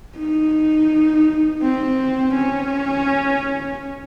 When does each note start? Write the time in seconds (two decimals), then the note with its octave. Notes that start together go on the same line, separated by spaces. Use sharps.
0.18 D#4
1.63 C4
2.35 C#4